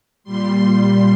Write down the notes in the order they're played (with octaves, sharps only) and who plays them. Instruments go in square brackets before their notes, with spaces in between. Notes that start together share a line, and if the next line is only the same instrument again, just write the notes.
[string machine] A#2 G3 C6